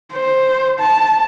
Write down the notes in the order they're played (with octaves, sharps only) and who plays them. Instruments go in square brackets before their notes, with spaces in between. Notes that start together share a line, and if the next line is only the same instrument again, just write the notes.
[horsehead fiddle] C5
A5